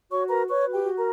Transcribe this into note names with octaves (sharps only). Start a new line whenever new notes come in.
F#4 C#5 C#6
A#4 B4 A#5
B4 C#5 C#6
F#4
G4 G5
F#4
A#4 A#5